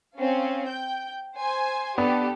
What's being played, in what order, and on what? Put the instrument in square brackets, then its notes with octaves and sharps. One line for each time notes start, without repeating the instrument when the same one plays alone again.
[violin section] C4 C#4 F5
G5 G6
C5 G#5
[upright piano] B3 D4 B4 [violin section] G4 A4